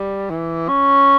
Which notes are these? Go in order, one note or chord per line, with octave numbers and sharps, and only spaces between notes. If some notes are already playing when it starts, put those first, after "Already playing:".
Already playing: G3
E3
C#4